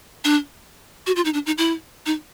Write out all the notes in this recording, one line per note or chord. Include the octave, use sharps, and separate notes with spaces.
D4
F#4
F4
D#4
D4
D#4
E4
D#4